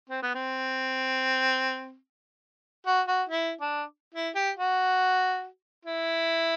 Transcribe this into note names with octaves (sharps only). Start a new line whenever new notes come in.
C4
B3
C4
F#4
F#4
E4
D4
E4
G4
F#4
E4